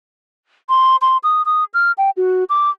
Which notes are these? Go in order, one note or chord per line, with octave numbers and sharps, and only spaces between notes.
C6
C6
D#6
D#6
F6
G5
F#4
D6